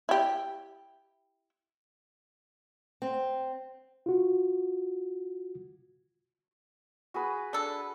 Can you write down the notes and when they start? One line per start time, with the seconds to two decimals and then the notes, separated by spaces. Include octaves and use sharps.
0.09 E4 G4
3.02 C4
4.06 F4 F#4
7.14 F#4 G#4 B4
7.53 D4 A4